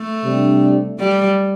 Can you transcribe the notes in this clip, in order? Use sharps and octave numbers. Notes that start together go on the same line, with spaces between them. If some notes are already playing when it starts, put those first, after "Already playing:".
Already playing: A3
C3 G3 D4
G3